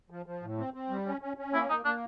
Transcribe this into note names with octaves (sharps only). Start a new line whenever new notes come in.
F3
F3
A2
C4
C4
G3
C#4
C#4
C#4
A#3 E4
A#3 D#4
A#3 D4